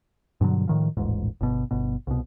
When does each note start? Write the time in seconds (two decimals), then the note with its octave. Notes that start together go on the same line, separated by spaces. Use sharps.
0.41 G2 B2 D3 F#3
0.68 A2 D#3 F3
0.97 D#1 A1 G#2
1.41 G1 B2
1.71 G1 B2
2.07 C2 B2